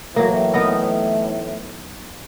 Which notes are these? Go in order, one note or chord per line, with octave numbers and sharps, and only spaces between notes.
A2 E3 F#3 A#3
B3 D#4 A#4